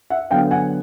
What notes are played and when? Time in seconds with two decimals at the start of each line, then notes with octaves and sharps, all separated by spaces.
0.10 E5 F#5
0.31 D3 F#3 B3 F5 G5
0.51 F#5 G#5